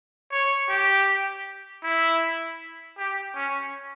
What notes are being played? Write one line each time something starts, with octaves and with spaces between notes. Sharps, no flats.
C#5
G4
E4
G4
C#4